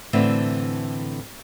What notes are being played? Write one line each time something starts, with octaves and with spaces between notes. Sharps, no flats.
A2 D3 E3 C4 E5